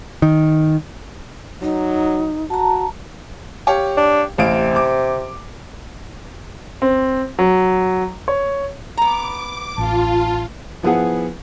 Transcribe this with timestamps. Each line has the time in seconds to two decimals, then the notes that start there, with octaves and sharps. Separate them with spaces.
0.22 D#3
1.62 F#3 D#4
2.50 F#4 A5 A#5
3.67 G4 C#5 F5
3.97 D4
4.38 A1 C3 F5 D7
4.76 D6
6.82 C4
7.39 F#3
8.28 C#5
8.97 B3 A#5 D6
9.78 A1 F4 A5
10.83 F3 B3 E4 G#4 F#5